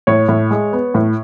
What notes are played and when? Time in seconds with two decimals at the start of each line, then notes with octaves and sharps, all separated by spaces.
0.07 A2 C#5
0.29 A2
0.51 G#3
0.73 B3
0.94 A2